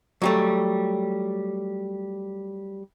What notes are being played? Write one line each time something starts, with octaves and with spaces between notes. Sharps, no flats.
F#3 G3 A3